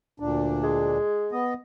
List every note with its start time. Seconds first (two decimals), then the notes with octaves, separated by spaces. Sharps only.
0.20 D2 A#2 D4
0.63 G#3
1.32 B3 D#5